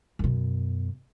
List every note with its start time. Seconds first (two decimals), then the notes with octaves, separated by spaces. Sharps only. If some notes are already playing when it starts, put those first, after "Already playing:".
0.19 F#2 B2